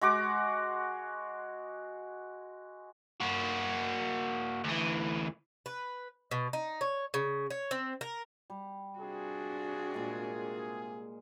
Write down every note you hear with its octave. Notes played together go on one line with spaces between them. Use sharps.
G#3 F#4 D6
A#3 F#4
D2 E3
B4
B2
D#4
C#5
C#3
C#5
C4
A#4
G3
C3 D4 F4 F#4 G#4
A#2 G#3